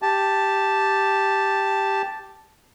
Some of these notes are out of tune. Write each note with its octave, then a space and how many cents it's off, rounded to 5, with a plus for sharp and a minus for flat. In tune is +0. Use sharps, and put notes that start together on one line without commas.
G4 +0 A5 +0